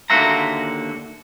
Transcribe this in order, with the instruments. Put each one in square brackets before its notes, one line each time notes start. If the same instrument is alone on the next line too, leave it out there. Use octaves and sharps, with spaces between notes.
[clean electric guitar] D#2 D3 A#3 F#4 E5 A#5